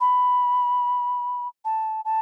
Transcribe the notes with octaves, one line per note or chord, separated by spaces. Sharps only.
B5
A5
A5